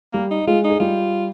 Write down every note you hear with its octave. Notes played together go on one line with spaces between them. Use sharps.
G3 A#3 G4
D#4
G#3 F4 G#4
D#4
G#4
G3 F4 G4